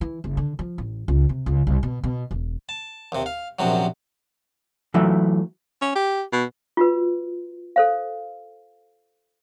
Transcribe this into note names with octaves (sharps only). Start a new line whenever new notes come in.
E3
F#1
D3
F3
A1
C#2
C3
C#2
C2
B2
B2
E1
A5
D#2 C3
F5
A#1 F#2 C3 F#3
E3 F#3 A3 E4
C#4
G4
B2
F4 F#4 B4
A4 C5 F5